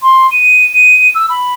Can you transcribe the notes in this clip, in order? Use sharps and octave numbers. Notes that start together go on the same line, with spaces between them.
C6
D#7
D#7
E6
B5